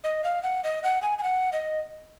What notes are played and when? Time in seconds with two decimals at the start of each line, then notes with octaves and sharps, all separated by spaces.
0.04 D#5
0.24 F5
0.43 F#5
0.64 D#5
0.84 F#5
1.02 G#5
1.18 G#5
1.23 F#5
1.53 D#5